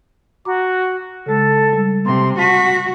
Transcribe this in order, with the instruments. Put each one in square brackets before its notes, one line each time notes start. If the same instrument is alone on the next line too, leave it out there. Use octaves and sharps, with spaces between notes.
[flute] F#4 [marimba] A#5 D6
[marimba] C#3 G#3 [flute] A4
[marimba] G3
[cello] C3 [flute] C6
[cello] F#4 [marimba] A5 [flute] B6